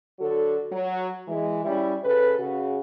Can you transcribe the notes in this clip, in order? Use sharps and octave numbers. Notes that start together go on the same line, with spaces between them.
D3 F#3 F#4 A4
F#3
E3 G#3
G3 C#4 E4
C#3 A4 B4
C#3 F#4